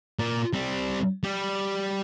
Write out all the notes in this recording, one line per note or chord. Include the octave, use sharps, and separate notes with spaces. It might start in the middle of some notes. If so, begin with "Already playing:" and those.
A#2
G3 C4
G3 G4